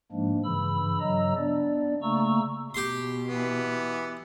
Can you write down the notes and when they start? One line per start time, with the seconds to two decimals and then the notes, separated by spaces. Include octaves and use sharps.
0.12 G#2 F3 G#3 A#3 D4
0.44 G2 C#3 E3 B5 E6
1.00 G2 C#3 F#3 D#5 A#5 E6
1.36 B3 D4 D5
2.02 C#3 A3 A#3 A#5 C#6 E6
2.74 B2 G4 C6
3.28 E3 B3